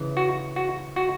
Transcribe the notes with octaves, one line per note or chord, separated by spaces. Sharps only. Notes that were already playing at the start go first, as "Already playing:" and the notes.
Already playing: C#3 E3
F#4
F#4
F#4